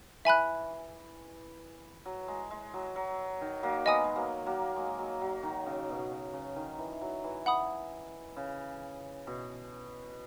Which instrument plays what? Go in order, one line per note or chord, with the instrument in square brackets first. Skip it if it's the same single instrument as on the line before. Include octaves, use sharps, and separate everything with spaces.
[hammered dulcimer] E3 [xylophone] E5 G#5 B5 F#6
[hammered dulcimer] F#3
G#3
G#3
F#3
F#3
D#3
F#3 A#3
[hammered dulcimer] G#3 B3 [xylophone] D#5 G#5 D#6
[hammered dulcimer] G#3
F#3 A#3
F#3 A#3
G#3
F#3
F#3
D#3
C#3
B2
C#3
C#3
D#3
E3
F#3
E3
[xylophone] F#5 B5 D#6
[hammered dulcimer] C#3
B2